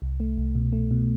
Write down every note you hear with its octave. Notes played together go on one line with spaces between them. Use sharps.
C2
A3
C2
B2
A3
B2